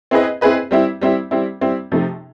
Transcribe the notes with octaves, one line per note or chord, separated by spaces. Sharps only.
C4 E4 G#4 B4 D#5
C4 E4 G#4 B4 D#5
G3 C4 E4
G3 C4 E4
G3 C4 E4
G3 C4 E4
C3 F3 A3 C4 D#4